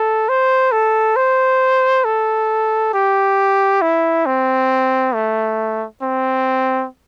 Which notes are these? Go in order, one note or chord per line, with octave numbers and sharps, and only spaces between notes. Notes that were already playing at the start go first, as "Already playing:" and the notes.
Already playing: A4
C5
A4
C5
A4
G4
E4
C4
A3
C4